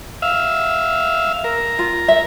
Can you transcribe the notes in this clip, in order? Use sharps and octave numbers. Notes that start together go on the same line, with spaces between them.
E5 F5
A#4
F4
E5